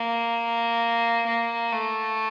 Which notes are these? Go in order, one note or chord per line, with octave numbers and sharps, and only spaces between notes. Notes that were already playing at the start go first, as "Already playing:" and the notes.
Already playing: A#3
A#3
A3